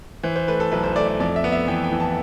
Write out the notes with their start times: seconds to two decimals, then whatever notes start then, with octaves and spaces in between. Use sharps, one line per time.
0.23 E3 C5
0.36 C5
0.48 A3 B4
0.60 A4
0.72 B1 B4
0.84 C5
0.96 A3 D5
1.08 D5
1.20 F2 D5
1.36 E5
1.44 B3
1.52 E5
1.68 E3 G5
1.84 G5
1.92 E3
2.00 A5